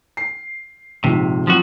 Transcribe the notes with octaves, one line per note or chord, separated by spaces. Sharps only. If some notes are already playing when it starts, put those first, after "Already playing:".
C7
A#1 G#2 C3
F3 F#3 C4 F4 F#4